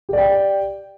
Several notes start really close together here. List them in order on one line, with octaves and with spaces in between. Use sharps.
G4 D5 G5